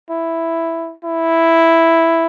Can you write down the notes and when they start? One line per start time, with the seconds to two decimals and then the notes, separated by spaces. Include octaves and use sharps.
0.10 E4
1.04 E4